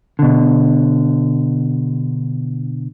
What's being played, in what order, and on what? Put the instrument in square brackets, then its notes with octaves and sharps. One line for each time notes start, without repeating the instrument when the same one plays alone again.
[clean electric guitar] B2 D3